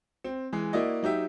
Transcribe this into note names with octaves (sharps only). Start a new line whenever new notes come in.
C4
E3 G#3
A#3 E4 F#4 D5 D#5
F#3 D#4 G4 E5